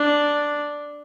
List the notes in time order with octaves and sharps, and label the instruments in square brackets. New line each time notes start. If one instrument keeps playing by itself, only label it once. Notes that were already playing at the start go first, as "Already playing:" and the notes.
Already playing: [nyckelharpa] D4